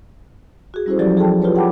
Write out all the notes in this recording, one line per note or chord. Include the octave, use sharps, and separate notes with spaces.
F#4 G#4
G3 C#4 E4 F#4 A4 C5
F3 F#3 E4 G4 A4 D5
G#4 A4 G5 A5
F4 G4 A4 B4 C#5
G#4 F#5 G5 A5 B5 D6